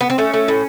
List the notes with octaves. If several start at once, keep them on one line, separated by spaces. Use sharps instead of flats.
B3
C4
A3 C#4
A3
A2